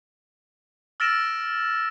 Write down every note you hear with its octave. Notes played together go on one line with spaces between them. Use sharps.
E6 F6 A6 A#6 D7 E7